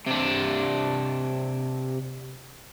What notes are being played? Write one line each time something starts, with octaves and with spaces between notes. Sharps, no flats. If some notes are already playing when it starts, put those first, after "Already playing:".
C3 D4